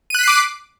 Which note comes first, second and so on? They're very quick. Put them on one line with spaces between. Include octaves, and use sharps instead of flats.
D#7 F#6 B6 C7 D6